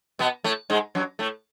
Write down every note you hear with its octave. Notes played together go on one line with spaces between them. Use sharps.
B2 B3
A2 A3
G#2 G#3
F#2 F#3
A2 A3